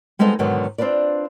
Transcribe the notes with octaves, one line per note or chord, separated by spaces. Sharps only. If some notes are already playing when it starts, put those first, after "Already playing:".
G3 G#3 B3 C4 D#4 A4
G#2 B2 D3 D#3 F#3
C4 D4 F4 B4 D5